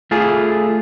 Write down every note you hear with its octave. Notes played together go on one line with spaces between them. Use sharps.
A3 F4 G#4